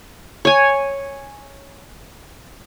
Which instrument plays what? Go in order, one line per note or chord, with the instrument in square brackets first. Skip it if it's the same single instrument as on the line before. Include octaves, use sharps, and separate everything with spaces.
[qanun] C#5 G#5